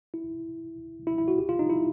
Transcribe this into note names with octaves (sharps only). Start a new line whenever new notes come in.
E4
E4
E4
F#4
G4
F4
D#4
E4